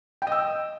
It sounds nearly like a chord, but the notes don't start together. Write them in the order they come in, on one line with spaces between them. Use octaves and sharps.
G5 D#5 E6